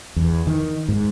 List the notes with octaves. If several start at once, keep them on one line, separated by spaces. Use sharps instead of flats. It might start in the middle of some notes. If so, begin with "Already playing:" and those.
E2
D#3
G#2